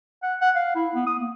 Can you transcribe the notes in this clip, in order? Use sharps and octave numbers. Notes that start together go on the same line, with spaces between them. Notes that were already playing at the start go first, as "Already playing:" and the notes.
F#5
F#5
F5
E4
B3
D#6
A#3